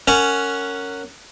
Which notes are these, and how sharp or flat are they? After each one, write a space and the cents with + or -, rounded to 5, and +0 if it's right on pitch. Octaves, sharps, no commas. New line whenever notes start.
C#4 +5 A#4 -20 F#5 +0